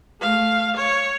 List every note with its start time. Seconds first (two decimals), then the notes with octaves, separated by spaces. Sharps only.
0.20 A3 F5
0.77 C#5